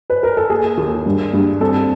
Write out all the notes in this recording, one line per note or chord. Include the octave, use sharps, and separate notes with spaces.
B4
A#4
A4
A#3 G#4
D#2
G2
G2
C4 A4